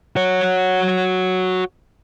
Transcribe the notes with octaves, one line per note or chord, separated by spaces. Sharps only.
F#4 C#5